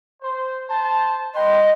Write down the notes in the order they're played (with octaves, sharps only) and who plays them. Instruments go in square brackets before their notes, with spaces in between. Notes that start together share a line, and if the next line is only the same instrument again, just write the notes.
[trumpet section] C5
C5 A5
[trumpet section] B4 G5 C6 [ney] D#5